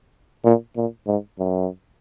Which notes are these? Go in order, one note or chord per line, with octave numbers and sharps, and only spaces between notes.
A#2
A#2
G#2
F#2